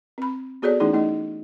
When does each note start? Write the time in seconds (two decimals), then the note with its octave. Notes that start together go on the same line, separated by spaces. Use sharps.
0.18 C4 B5
0.62 B3 F#4 G#4 A4 C#5 D5
0.80 E3 A3 C#4 D#4 E4 G#4
0.93 A3 D#4 D#5